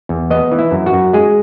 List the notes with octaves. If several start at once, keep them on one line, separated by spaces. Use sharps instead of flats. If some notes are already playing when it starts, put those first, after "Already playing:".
E2
B3 D#5
E3
E4
F#2
F#4
F#2
G#3 G#4